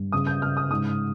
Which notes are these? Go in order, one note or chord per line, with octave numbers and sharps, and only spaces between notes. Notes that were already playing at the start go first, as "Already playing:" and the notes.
Already playing: G2
C#3 D#6
G6
C#3 F6
D#6
G#2 D#6